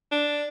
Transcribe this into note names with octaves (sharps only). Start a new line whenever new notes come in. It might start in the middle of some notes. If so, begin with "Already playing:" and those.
D4